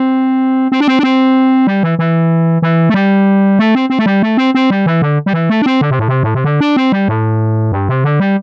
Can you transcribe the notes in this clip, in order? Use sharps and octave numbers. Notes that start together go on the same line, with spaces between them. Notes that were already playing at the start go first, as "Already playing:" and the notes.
Already playing: C4
C4
D4
C4
D4
C4
G3
E3
E3
E3
A3
G3
A3
C4
C4
A3
G3
A3
C4
C4
G3
E3
D3
G3
E3
A3
D4
C4
D3
C3
A2
C3
A2
C3
D3
D4
C4
G3
A2
G2
C3
D3
G3